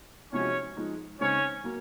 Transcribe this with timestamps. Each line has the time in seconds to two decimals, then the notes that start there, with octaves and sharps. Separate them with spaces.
0.33 C3 F3 G#3 C#4 D#4 F#4 C#5
0.76 F3 G#3 D#4
1.20 C#3 G#3 C4 C#4 D#4 C#5
1.64 F#3 A#3